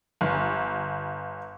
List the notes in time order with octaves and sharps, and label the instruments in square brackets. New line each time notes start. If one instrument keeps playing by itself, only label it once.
[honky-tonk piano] G1